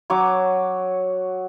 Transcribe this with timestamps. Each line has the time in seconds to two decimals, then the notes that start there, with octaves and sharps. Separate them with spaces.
0.10 F#3 C#5 D6